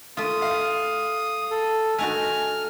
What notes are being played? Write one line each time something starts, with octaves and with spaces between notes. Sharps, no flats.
A3 F4 D#6
F5
A4
A3 D#4 F#4 G#5 F6